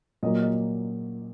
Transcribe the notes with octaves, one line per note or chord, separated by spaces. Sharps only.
A#2 F#3 A#3 D#5
D#5